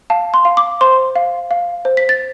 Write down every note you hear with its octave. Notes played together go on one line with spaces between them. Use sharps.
F5 A5
C6
F5
D6
C5 C6
F5
F5
C5
B6
A6